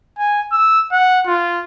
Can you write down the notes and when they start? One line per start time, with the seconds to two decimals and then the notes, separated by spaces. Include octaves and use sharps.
0.19 G#5
0.52 E6
0.92 F#5
1.27 F4